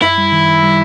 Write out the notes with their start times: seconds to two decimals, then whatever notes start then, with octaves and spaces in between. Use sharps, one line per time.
0.02 F#2 E4
0.18 G3
0.32 D#3
0.48 D#3
0.63 G3